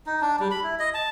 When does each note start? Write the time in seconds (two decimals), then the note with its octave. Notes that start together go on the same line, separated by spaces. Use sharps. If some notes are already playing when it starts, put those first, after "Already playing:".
0.06 D#4
0.21 D4
0.39 G3
0.51 B5
0.63 E4
0.79 D#5
0.94 A5